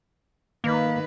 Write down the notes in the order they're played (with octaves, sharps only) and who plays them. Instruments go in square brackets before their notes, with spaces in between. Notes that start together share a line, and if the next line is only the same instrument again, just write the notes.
[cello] D#3 B4 [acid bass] A#3